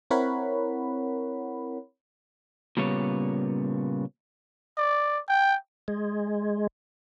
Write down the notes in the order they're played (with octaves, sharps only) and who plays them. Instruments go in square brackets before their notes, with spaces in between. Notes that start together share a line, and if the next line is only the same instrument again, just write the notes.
[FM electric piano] C4 E4 A#4 C#5 F#5 B5
[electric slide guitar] A#2 C#3 G3 B3 C#5
[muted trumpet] D5
G5
[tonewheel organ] G#3